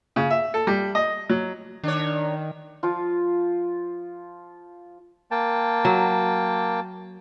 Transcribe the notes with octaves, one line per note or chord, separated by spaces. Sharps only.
C#3
E5
A4
G3
D#5
F#3
D#3 D4 C#5
F3 F4
A#3 G5 A5
F#3